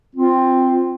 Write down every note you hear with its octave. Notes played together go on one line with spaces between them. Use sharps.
C4 F4